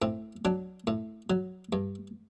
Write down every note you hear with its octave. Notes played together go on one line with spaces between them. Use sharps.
A2 C4
F#3 D4
A2
F#3
G2